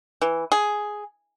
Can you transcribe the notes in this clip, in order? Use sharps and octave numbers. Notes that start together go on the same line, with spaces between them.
E3
G#4